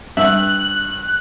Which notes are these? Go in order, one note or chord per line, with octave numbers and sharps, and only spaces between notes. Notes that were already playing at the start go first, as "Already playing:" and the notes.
G2 E5 F#6